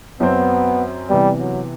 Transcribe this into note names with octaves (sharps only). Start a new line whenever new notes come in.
F#2 F#3 B3 C4
C3 E3 G3 B3
F#3